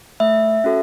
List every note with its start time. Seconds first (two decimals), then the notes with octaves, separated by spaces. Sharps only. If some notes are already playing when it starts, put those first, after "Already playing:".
0.20 A3 E5
0.64 C#4 F#4 A4